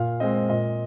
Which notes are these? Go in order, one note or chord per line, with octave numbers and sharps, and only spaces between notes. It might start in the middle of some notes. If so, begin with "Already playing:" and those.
Already playing: A#2 F5
G#3 C4 D#5
A#2 D#5